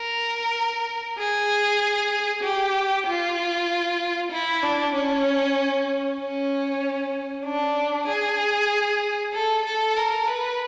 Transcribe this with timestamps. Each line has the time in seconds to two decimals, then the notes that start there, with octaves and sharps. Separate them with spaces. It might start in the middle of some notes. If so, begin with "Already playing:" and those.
Already playing: A#4
1.18 G#4
2.43 G4
3.07 F4
4.31 E4
4.63 D4
4.94 C#4
6.20 C#4
7.45 D4
8.07 G#4
9.33 A4
9.65 A4
9.96 A#4
10.27 B4